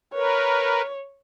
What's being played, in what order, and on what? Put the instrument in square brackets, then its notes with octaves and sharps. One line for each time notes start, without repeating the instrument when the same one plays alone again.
[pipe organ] A#4 B4 [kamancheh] C#5